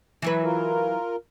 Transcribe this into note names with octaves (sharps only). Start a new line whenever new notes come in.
E3 F#3 B4
F4 A#4